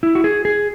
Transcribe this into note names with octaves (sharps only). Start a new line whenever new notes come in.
E4
F#4
G#4
G#4